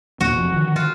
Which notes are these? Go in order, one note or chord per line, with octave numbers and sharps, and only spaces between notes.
D#2 A#2 F#3 F#4
F1 F3
D3 D#3 F3
F4 F#4